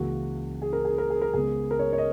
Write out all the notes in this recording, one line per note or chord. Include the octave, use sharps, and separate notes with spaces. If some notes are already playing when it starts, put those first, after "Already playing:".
Already playing: C#2 C#3 E3 A#3 F#4
G#4
A#4
G#4
A#4
G#4
A#4
C#2 C#3 G#3 B3 G#4
A#4
C#5
C#5
D#5